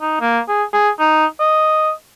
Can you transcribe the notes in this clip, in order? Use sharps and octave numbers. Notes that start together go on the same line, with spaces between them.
D#4
A#3
G#4
G#4
D#4
D#5